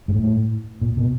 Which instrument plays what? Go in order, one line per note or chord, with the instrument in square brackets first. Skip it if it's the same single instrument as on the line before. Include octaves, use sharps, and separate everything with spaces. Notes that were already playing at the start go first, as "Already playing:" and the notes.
[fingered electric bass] G#2
A2
A#2
B2